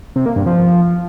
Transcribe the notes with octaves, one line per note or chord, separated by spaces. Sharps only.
C3
A#3
G2
F3